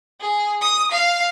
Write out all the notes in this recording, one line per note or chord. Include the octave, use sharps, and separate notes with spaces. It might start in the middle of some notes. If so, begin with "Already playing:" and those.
G#4
D#6
F5